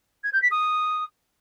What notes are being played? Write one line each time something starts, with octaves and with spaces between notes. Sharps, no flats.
G#6
G6
B6
D#6